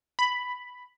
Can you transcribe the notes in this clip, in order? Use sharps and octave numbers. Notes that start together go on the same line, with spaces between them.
B5